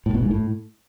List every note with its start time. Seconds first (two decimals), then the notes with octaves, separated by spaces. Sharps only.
0.06 A2
0.14 B2
0.23 G#2
0.31 A2